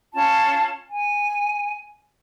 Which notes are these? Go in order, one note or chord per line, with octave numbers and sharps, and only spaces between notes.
C#4 F4 A5
G#5